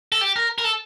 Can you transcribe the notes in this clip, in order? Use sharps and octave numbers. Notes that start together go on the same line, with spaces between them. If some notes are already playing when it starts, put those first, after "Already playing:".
A4
G4
A#4
A#4
A4